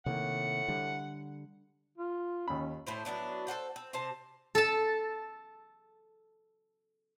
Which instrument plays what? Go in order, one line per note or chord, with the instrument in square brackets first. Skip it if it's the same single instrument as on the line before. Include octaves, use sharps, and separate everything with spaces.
[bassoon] A2 [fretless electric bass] C3 D#3 A#3 [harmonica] F#5
[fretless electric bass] D3 G3
[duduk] F4
[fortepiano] D#2 B5 [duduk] C#4
[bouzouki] A2 E4 C5
F#3 B3 D4 E4
A4 C5 F#5 G5
C4
C3 C5 A5
[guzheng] A4 A5